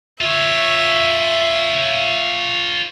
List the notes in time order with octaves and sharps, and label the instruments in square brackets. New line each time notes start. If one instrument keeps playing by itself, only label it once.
[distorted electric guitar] F4 C#5 [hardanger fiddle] E5